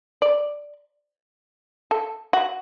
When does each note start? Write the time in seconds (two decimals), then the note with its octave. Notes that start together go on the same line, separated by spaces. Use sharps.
0.22 D5
1.91 A4
2.33 F#4